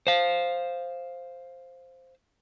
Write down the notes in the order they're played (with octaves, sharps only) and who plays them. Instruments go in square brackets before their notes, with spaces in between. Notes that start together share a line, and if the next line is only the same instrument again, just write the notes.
[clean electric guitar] C5 F5